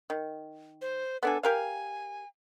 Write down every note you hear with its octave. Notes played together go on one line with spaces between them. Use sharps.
D#3
C5
B3 D4 A4 G#5
G4 A#4 F5 G#5